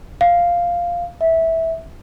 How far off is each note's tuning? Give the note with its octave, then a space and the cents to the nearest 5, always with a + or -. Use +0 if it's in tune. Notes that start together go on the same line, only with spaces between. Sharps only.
F5 -5
E5 -15